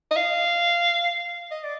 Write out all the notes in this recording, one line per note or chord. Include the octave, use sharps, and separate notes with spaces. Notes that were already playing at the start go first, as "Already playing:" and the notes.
D#5
F5
D#5
D5